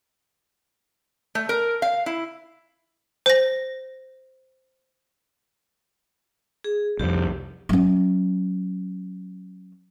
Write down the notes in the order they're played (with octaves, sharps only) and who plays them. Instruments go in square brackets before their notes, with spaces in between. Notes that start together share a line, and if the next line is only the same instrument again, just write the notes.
[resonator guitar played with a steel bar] A3
A#4
F5
E4
[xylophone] C5 A#6
[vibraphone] G#4
[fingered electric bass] C2 F2 [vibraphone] G4
[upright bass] F#3 C#4